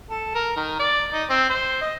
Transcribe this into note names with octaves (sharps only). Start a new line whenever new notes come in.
A4
A#4
D#3
D5
D#4
C4
C5
D#5